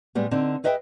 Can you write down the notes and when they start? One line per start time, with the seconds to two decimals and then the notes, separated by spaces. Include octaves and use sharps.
0.15 A2 G3 G#3 B3
0.31 D3 C4 D4 D#4
0.64 G#4 B4 D#5 E5 F#5 G5